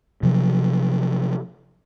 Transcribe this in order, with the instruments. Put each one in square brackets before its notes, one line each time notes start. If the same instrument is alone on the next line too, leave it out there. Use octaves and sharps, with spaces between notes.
[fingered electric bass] C3 F3 F#3